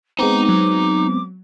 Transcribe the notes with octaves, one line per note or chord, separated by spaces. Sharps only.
G#3 B3 C4 D#4 A#5 D6
F#3